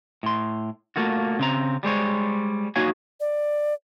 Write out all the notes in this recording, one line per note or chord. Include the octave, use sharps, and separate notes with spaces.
A2 C6
A3 A#3 F4 F#4
C#3 C4 A#5
G3 G#3 C5 C#5
A#3 D#4 F#4 C#5 F5 G#5
D5